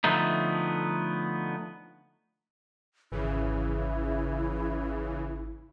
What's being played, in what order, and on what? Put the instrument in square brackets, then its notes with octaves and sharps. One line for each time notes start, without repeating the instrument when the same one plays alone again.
[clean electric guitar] D3 F3 A3 B3 D#4
[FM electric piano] G#1 [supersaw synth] C#3 E3 [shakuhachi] E4